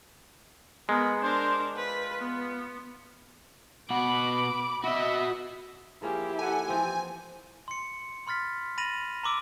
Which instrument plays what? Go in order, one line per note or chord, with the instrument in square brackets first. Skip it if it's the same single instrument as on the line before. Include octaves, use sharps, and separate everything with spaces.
[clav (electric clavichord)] G#3 [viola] B3 [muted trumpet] A#4
[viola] D4 A#4 [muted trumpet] C5
[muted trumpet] F4 [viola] B4
[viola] B3
[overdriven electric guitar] B2 F#5 [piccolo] B5 [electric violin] D6
[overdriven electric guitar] F#4 D#5 [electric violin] E5
[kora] F3 A#3 C#4 [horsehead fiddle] E4 G4 [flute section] G#4
[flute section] A4 F#5 [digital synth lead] G#5
[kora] E3 F3 C4 [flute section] G6
[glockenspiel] C6 C#7
B5 C6 F6 A6 B6
B5 A6 A#6 D#7 F7 F#7
A#5 C6 D6 E6 D7